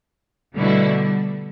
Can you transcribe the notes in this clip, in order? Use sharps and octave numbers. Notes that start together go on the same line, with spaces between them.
B2 D3 G3 A3 E4